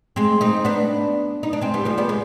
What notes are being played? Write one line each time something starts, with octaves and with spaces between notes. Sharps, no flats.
G#3 C4
C4 D#4
B3 D4
D#4
D4
G#3 C4
G3 B3
F3 G#3
B3 D4
G#3